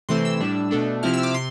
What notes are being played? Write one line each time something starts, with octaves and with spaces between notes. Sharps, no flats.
C3 E3 A3 C4 C6
E6
A2 G3 D4
B2 A3 D4
C3 F3 C4 E4 F6
E6
D6
C3 C6